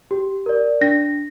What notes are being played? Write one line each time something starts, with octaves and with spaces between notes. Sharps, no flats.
G4
A#4 D5
D4 A#6